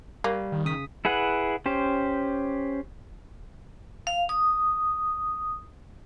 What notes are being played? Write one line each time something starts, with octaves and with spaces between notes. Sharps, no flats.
G3 A#3
D#3
C#3 D#6 B6
E4 G#4 B4 F#5
C#4 G4 C5
F5
D#6